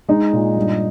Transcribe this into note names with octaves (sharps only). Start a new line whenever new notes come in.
G#3 D#4
A#2
G2